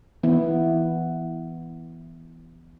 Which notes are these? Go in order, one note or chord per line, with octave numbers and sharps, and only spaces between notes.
E3 B3 E4